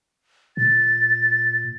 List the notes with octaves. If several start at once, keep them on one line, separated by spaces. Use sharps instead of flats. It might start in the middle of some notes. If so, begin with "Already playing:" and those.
A#2 A6